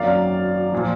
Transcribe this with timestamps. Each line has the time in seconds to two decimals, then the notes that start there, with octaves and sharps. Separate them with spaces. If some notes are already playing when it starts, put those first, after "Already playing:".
Already playing: G#1 F#2 D#3 F#3 A#3 D5 F5
0.72 A#2 F3